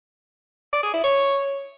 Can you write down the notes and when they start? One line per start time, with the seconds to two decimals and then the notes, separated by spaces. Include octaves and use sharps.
0.73 D5
0.83 G#4
0.93 E4
1.04 C#5